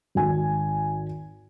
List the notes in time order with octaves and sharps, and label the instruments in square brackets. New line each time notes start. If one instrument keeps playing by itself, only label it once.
[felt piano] G#1 G#5